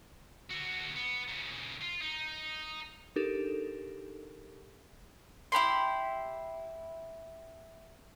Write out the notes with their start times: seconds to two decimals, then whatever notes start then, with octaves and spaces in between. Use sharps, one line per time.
0.50 D3 F#4
0.96 B3
1.28 A#2 C#3
1.82 F4
2.02 D#4
3.16 D4 D#4 G4 A4 A#4
5.52 E4 G4 B5 C6